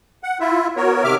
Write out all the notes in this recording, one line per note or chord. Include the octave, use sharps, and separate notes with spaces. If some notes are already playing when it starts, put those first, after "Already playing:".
F#5
E4 F4 E5
B3 F#4 A#4 C#5
C3 D#3 E5 D6 F6